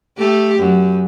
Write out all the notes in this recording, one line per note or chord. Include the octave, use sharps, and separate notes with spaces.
A3 G4
F#2